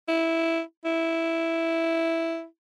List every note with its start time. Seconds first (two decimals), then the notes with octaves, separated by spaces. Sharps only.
0.08 E4
0.85 E4